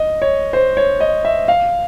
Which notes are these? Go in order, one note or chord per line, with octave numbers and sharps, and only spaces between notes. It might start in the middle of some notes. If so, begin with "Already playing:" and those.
Already playing: D#5
C#5
C5
C#5
D#5
E5
F5